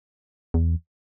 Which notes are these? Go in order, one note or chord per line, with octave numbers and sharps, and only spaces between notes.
E2